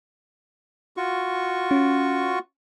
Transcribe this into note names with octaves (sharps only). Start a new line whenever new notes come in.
F4 F#4 C#6
C#4